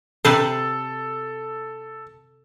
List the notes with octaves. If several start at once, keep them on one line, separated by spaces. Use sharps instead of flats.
C3 A4 B4 C5